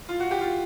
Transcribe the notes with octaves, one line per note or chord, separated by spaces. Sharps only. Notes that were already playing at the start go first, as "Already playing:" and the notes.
F4
F#4
G4
F4